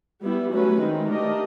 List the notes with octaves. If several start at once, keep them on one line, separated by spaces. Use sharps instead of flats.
G3 B3 E4
F#3 A3 C#4 F#4 B4
D#3 G#3 C4 D#4
A3 D4 G4 A#4 D#5